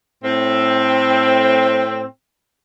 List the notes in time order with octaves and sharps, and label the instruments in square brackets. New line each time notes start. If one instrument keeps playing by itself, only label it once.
[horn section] A2 C4